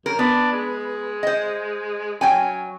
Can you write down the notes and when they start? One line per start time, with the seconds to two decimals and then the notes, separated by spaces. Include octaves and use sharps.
0.06 F#2 A#4
0.19 B3 D4
0.52 G#3
1.23 C5 D#5
2.21 F#3 C#4 G5 G#5